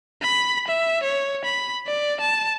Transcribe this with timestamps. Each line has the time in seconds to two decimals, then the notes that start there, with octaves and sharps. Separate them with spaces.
0.23 B5
0.68 E5
1.03 C#5
1.44 B5
1.87 D5
2.20 A5